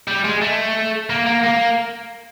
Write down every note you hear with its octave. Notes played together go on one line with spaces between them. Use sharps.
G3
G#3
A3
A#3
A#3
A#3